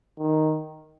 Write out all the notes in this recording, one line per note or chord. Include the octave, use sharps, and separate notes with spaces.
D#3